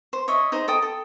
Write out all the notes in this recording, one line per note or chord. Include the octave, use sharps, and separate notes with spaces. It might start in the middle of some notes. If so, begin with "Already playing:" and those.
C5
C#5 D#5 E5
D#4 G#4 C5 D#5
A4 G5 D#6
A4